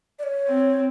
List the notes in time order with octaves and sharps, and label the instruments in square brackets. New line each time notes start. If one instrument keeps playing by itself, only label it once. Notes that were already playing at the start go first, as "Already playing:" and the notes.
[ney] D5
C#5
[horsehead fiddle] C4